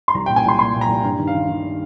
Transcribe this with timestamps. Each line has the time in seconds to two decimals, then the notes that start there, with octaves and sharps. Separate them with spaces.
0.08 C6
0.14 C2 A#5
0.26 G5
0.29 A#2
0.36 G#5
0.45 C2 C6
0.59 A#2 C6
0.74 A#2
0.81 A#5
0.89 C2
1.04 G2
1.19 D#3
1.27 F5
1.35 D#3
1.49 D#3